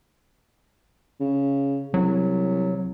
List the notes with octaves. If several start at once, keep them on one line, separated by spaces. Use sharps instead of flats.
C#3
C2 F#3